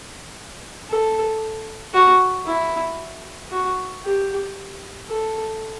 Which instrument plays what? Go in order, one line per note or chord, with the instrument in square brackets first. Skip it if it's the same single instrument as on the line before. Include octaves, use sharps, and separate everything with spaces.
[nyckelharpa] A4
F#4
E4
F#4
G4
A4